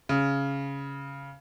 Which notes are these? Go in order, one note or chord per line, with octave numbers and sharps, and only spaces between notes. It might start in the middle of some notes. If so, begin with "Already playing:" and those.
C#3